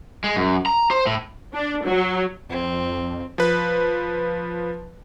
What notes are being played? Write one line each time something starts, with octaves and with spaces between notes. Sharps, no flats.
G#3
F#2
A#5
C5
A2
D4
F#3
F2 C4
F3 B4